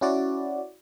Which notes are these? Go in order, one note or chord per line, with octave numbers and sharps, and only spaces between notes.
C#4 E4 F#4 D5